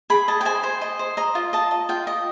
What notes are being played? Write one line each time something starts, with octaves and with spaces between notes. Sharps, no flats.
G#4 B5
D#5 A5
G5
C5 G#5
C5
D#5
C5
D#5 A#5
F4
D#5 A5
D#5
F4 G5
D#5